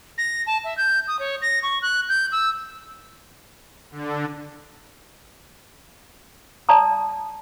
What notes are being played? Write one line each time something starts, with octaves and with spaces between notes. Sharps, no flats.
A#6
A5
E5
G6
D#6
C#5
A#6
C#6
F#6
G6
E6
D3
D5 A5 A#5 D#6